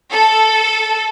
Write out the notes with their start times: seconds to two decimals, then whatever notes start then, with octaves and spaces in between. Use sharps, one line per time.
0.13 A4